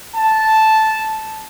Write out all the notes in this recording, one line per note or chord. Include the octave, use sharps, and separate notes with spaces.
A5